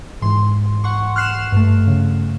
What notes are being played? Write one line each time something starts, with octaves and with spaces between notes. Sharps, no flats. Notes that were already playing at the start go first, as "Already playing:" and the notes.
G#2 E3 C6
F#5 C6 C#6
F6 F#6 C7 E7
G2 A3
C#3